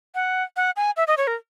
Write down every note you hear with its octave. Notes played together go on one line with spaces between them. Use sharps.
F#5
F#5
G#5
E5
D#5
C#5
A#4